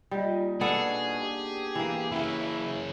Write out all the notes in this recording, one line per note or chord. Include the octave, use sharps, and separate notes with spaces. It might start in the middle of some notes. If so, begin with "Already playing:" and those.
A#2 G3 D#4
B2 B3 D4 G#4 A4
G4
E3 A#3
C#3 F#3 E4